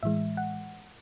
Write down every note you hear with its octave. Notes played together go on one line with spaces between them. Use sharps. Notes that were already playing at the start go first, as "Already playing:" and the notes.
A2 E3 G#3 E5
F#5